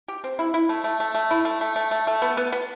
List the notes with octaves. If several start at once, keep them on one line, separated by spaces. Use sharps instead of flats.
G4
C4
E4
E4
A3
A3
A3
A3
E4
A3
A3
A3
A3
A3
B3
B3
B3